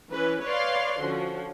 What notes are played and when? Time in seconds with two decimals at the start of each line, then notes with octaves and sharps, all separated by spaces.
0.13 E3 C#4 B4
0.43 B4 C#5 D5 F5 C6
1.02 D3 F3 C#4 F#4